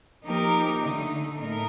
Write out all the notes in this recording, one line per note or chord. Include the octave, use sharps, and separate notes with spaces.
F3 A#3 D#4 G4 A#4
D3 A3 D#4
A2 A3 D#4 A#4